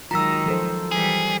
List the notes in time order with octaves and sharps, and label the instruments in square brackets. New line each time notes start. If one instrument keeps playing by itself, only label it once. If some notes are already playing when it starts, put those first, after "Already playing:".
[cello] D#3 G#3 [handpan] F#3 F4 [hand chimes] A#5 E6
[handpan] F3 A4 C5
[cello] E3 G3 [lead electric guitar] G#4